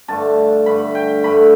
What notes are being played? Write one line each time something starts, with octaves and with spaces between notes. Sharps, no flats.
G2 D3 A3 A5
G2 D3 A3 B5
G5
G2 D3 A3 B5